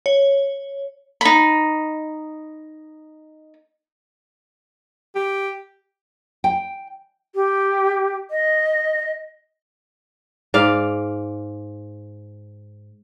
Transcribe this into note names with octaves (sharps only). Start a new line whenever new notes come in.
C#5
D#4 B5
G4
G5
G4
D#5
G#2 D5 F5